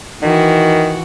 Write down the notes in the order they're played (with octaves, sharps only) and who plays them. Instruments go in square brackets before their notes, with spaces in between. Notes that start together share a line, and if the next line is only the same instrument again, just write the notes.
[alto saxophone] D#3 [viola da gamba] E3 F#4